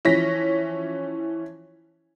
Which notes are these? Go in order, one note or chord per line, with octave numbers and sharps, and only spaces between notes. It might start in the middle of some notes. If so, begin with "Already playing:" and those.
E3 F3 C#4 A#6 B6